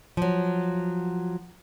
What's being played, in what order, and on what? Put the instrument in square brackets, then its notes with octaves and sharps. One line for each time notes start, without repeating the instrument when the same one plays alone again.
[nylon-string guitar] F3 F#3